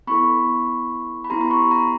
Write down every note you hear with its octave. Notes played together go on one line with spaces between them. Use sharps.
B3 E4 A4 B5 C#6
B5
B3 E4 G4 A#5 C6
C6
B5 C#6
A#5 C6